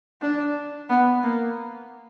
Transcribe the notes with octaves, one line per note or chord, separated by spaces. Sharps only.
D4
B3
A#3